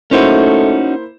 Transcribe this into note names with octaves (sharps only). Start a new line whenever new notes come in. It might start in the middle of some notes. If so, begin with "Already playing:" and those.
A3 A#3 C#4 D#4 E4 F#4 C5